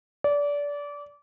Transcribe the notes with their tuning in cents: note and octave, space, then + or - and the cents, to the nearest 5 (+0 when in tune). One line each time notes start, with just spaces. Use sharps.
D5 -25